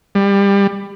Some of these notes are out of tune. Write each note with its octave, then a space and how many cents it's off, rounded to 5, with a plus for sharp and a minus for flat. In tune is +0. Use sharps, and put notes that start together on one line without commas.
G3 +25